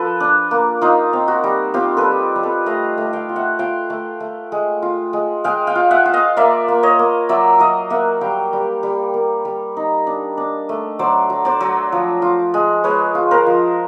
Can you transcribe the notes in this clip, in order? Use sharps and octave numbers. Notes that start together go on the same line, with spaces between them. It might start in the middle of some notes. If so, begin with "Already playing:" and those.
Already playing: F3 A4 B4
D4
A#3
D#4 F4
C4
F#4
G3
C4 F4 G4
A4 B4
G3
G3
A4 B4
A3 D#5 F5
A3
F5 G5
F4
E5 F#5
F4 F5 G5
A3
A3
G#3
F4
G#3
G#3 F5 G5
F5 G5
F4
E5 F#5
F4
D#5 F5
A#3 D5 E5
A#3
C#5 D#5
A#3
F#3 D5 E5
F#3 D#5 F5
A#3 E5 F#5
G3 F5 G5
G3
G3
A#3
G3
D#4
D4
D4
A3
F#3 C5 D5
F#3
C5 D5
F#3
F3
F4
G#3
G#3 B4 C#5
F4
A#4 C5
F3